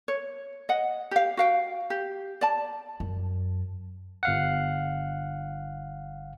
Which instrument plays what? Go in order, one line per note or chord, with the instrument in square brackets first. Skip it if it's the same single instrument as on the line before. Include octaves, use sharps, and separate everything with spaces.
[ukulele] C#5
D#5 F#5
G4 F5
F#4 F5 G5
G4
D5 A5
[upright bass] F#2
[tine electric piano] G1 F5 F#5